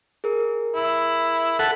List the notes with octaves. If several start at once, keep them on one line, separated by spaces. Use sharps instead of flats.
G#4 A#4
E4
A4 F#5 A6 B6